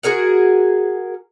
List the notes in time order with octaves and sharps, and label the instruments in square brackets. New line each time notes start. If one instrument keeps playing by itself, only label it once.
[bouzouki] F#4 G#4 A#4 F#5